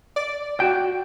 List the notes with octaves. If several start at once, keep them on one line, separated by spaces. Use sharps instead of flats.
D5
F#4 G5